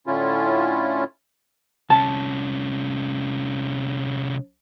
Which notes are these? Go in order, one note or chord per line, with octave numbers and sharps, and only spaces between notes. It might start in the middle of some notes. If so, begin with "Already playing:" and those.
A2 D3 C#4 E4 F4
C2 C#4 A5